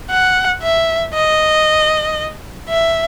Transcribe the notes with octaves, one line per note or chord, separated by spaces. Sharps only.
F#5
E5
D#5
E5